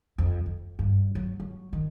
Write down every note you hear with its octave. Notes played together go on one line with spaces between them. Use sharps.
F2
F2
G2
F#3
F#3
D#3